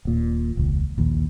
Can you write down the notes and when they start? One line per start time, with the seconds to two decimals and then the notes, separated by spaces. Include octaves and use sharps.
0.05 D#1 A#2
0.57 E1 C#2
0.98 A#1 D#2